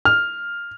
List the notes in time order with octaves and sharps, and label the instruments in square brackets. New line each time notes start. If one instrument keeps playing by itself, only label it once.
[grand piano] F6